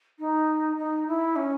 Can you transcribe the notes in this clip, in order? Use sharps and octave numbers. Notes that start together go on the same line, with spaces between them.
D#4
D#4
E4
C#4